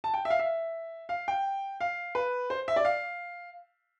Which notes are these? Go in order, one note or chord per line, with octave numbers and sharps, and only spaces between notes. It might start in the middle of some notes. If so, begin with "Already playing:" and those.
A5
G5
E5
F5
E5
F5
G5
F5
B4
C5
E5
D5
F5